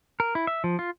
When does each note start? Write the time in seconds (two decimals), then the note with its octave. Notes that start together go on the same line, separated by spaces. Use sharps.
0.20 A#4
0.35 E4
0.47 E5
0.64 F3
0.79 F4